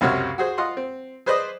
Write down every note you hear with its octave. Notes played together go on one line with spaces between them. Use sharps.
C#2 F#2 C3 F#4 C#5 F6
F#4 G#4 C5
F4 D#5 F#5 C6
C4
G#4 B4 C5 D5 D#5